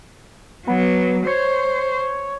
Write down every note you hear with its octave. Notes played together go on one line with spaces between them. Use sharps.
F#3 B3
C5 C#5